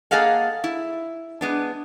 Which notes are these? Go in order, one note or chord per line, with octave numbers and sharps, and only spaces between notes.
A#3 G#4 A4 D#5 F5 F#5
E4
G#3 B3 D4